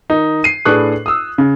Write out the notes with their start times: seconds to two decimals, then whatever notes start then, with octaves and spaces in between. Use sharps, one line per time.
0.10 D#3 D#4
0.44 C7 D#7
0.65 A2 D4 G#4 B4 C#6 F#6
1.06 D#6 E6
1.38 C#3